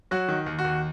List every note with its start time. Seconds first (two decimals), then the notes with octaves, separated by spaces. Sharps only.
0.11 F#3 F#4
0.28 D#3
0.46 D#2
0.59 F#4
0.65 D#2